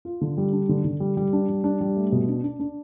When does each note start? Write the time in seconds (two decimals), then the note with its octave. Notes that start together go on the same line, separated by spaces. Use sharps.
0.05 F4
0.21 D3
0.38 G3
0.53 D4
0.69 D3
0.85 D3
1.00 G3
1.17 G3
1.33 D4
1.49 G3
1.64 D4
1.81 G3
1.97 A3
2.12 B2
2.28 D4
2.44 D4
2.60 D4